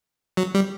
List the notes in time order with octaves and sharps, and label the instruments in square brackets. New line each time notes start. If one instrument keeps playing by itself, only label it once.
[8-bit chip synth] F#3
G3